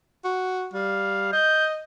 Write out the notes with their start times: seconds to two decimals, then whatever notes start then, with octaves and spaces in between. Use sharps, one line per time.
0.24 F#4
0.73 G3 F5
1.33 D#5 G6